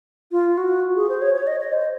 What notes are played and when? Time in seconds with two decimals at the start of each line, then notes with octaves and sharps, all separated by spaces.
0.32 F4
0.57 F#4
0.96 G#4
1.09 C5
1.22 C#5
1.35 C#5
1.47 D#5
1.60 D#5
1.73 C5